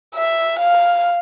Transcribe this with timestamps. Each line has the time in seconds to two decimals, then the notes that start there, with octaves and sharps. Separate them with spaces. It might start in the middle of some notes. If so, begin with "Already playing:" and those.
0.15 E5
0.59 F5